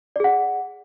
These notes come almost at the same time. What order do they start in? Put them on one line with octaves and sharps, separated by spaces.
D5 G#4 F#5